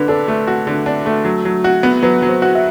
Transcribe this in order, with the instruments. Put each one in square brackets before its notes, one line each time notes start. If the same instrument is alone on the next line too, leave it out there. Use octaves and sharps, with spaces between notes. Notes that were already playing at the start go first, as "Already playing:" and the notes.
Already playing: [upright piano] D3 [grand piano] B4
[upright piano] D4 [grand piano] A4
[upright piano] A3
F#4
D3
D4
A3
F#3
F#3
F#4
B3
[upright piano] F#3 [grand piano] B4
[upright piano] F#3
[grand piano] C5
[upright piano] F#4
[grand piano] E5